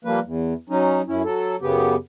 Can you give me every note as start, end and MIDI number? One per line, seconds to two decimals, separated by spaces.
0.05 0.20 53
0.05 0.20 55
0.05 0.20 58
0.05 0.20 71
0.25 0.53 40
0.69 1.02 54
0.69 1.02 61
0.69 1.02 63
1.08 1.22 42
1.08 1.22 61
1.08 1.22 64
1.23 1.56 54
1.23 1.56 69
1.61 1.95 42
1.61 1.95 49
1.61 1.95 59
1.61 1.95 67